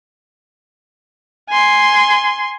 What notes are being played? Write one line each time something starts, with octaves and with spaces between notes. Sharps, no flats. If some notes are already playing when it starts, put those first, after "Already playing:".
G#5 C6